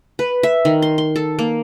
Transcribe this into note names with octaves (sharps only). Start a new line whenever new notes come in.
B4
E5
D#3
C6
C6
A4
A#3